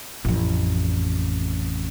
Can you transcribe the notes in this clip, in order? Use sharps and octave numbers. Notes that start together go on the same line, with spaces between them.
A1 F2